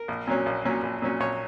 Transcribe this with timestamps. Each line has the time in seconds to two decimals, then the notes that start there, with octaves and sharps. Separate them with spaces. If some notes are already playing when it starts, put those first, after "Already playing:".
Already playing: A#4
0.08 A#1
0.27 A#2 F#3 C#4
0.46 A#1
0.65 A#2 F#3 C#4
0.83 A#1
1.02 A#2 F#3 C#4
1.20 A#1 C#5